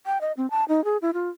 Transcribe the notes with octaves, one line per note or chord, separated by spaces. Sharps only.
G5
D#5
C4
A5
D#4
G#4
E4
F4